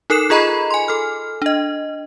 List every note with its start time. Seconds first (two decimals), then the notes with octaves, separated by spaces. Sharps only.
0.10 D#4 A4 A#4 F#6 C7 E7
0.30 F4 G#4 D#5 A#5 B5
0.71 G#5 C6
0.88 A4 F6
1.42 D4 D#5